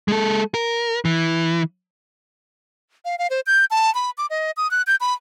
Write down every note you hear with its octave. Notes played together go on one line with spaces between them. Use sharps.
G#3 A4
A#4
E3
F5
F5
C5
G6
A5
B5
D6
D#5
D#6
F#6
G6
B5